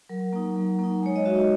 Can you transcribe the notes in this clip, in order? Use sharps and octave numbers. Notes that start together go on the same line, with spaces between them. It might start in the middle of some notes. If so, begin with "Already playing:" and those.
F#3 A#4
A#3 D#4
F#3
A#3 D#4
G#3 C#5
D#5
D#4 F#4 E5